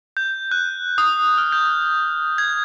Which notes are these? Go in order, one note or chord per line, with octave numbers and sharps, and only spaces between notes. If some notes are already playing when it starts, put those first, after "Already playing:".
G6
F#6
D#6
F6
G6
G#6